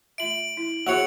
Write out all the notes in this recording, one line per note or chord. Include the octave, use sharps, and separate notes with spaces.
A3 F4 E5 D7 F#7
E4
A#3 F4 F#4 G#4 C#5 C#7 F7 F#7